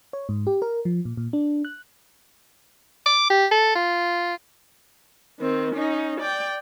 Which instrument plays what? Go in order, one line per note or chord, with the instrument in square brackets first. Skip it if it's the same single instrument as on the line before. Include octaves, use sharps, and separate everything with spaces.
[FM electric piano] C#5
G#2
G4
A#4
F3
A#2
A#2
D4
F#6
[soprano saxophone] D6
G4
A4
F4
[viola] D#3 C4
C#4 D#4
D5 G5